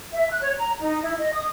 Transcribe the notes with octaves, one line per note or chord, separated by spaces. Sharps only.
E5
F#6
C#5
A#5
D#4
E4
D#5
D#6